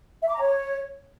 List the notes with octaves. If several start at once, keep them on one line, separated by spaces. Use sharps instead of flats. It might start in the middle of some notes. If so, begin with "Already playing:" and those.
E5
D6
A#5
C#5